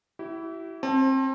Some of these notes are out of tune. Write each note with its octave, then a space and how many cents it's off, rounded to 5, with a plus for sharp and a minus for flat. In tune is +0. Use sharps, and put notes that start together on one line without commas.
E4 +0 G4 -45
C4 +30 A5 +0